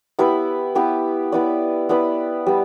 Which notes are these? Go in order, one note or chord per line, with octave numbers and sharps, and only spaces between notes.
B3 E4 G4 B4
B3 E4 G4 B4
B3 E4 B4 D5
B3 E4 B4 D5
G3 B3